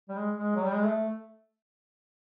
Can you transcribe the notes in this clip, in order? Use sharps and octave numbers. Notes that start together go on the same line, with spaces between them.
G3
G#3
G#3
F#3
G3
G#3
A3